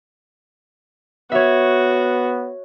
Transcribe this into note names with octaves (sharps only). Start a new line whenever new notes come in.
B3 F#4 C#5 E5